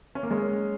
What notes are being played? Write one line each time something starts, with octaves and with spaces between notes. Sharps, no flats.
C#4
A#3
G#3 C#4